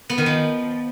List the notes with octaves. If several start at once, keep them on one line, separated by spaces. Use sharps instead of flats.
B3
D#3
F3